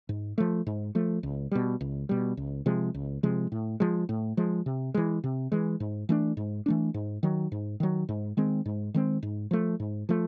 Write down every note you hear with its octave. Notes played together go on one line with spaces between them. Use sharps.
G#2
F3 A3
G#2
F3 A3
C#2
B2 G3
C#2
B2 G3
C#2
C3 F3 G#3
C#2
C3 F3 G#3
A2
F3 G#3
A2
F3 G#3
C3
E3 G#3
C3
E3 G#3
G#2
E3 A3 D4
G#2
E3 A3 D4
G#2
D#3 F#3
G#2
D#3 F#3
G#2
D#3 G#3 C4
G#2
D#3 G#3 C4
G#2
F3 A3
G#2
F3 A3